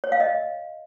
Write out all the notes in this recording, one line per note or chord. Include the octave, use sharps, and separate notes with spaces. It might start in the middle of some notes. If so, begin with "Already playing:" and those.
C#5
F5
D#5